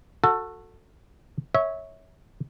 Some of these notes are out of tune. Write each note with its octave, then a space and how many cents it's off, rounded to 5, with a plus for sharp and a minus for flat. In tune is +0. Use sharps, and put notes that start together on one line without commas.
F#4 -20 A4 +15
C#5 +0 E5 -25